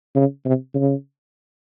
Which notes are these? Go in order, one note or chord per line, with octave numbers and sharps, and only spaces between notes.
C#3
C3
C#3